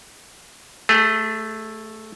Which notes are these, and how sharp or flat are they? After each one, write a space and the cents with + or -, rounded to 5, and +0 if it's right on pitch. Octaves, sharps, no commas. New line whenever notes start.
A3 +0 G#4 -30